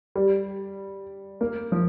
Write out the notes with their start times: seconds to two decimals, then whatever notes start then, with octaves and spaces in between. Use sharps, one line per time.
0.15 G3
1.41 A#3
1.72 F3